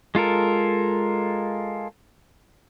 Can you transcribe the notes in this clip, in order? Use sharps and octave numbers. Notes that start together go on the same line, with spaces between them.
G#3 F4 A4 A#4